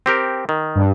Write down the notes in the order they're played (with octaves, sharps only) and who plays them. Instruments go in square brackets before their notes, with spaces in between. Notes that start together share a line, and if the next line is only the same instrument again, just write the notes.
[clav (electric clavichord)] C4 G4 A#4
D#3
[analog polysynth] G2